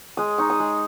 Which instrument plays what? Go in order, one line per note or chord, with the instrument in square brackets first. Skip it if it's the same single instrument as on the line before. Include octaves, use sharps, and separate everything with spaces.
[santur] G#3 D#6
D#4 C#6
D#6
G#3